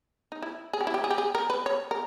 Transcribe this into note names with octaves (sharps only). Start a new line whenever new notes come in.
D#4
E4
G#4
G4
E4
G4
G#4
G4
G#4
A#4
B4
C#5
A#4